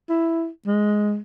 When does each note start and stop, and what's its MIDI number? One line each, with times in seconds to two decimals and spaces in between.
0.09 0.48 64
0.66 1.19 56